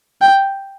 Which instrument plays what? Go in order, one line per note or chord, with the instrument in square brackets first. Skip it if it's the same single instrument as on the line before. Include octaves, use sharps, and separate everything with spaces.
[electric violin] G5